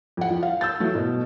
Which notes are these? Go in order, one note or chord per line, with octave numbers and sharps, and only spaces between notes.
F2 F#5
F3
F5
E6 G6 A6
E3 F#3 A3
B2